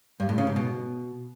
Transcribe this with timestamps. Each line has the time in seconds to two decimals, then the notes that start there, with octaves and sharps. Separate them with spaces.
0.20 G2
0.29 A2
0.38 C#3
0.47 G#2
0.56 B2